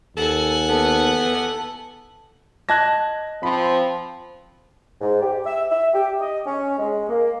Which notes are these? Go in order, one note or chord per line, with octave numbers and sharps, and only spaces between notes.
D#2 A4 F#5 G#5
B3 A4
D#5 A5 F#6 G#6 A#6
F3 C4 B5
G#2
G4
E5
E5
G4
D#5
C#4
G#3
A#3